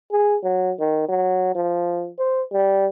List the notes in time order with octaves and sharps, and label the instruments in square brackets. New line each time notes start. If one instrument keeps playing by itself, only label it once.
[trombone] G#4
F#3
D#3
F#3
F3
C5
G3